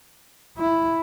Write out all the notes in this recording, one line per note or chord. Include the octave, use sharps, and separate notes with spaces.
E4